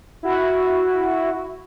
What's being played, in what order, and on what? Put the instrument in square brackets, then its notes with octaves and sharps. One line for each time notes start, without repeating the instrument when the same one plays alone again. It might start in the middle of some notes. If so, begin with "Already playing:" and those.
[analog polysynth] E4 F#4